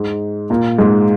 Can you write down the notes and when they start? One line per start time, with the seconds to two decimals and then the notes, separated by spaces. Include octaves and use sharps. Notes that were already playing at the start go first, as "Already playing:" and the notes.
Already playing: G#2 G#3
0.50 A#2 A#3
0.78 G#2 G#3